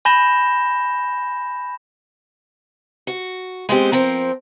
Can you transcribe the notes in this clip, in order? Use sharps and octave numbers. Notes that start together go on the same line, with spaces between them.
G#5 B5 G6 A#6 E7 G7
F#4
G#3 B3 C4 G4
F3 C4 A#4